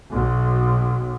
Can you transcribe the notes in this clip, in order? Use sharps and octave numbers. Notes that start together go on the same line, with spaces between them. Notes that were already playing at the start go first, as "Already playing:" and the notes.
B1